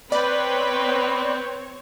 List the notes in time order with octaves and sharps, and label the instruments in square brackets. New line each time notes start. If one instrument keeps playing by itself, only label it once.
[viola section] C4 C#5 [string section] B4 G5 [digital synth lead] D5